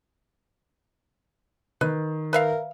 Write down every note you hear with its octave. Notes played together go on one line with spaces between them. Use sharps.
D#3 B4
A#4 B4 E5 F5